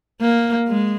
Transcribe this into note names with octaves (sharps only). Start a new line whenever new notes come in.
A#3
G#3